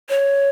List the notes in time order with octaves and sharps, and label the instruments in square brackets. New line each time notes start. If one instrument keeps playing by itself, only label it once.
[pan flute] C#5